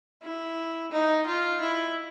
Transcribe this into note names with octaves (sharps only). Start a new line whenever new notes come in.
E4
D#4
F4
E4